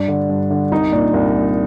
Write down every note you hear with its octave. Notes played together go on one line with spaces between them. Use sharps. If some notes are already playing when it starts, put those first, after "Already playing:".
Already playing: G2 D4
D3
G2
D3
C2 D#4
A#2 D4
C2
A#2